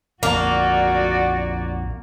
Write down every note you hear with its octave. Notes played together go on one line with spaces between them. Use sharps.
A#1 F2 A#3 F#4 D5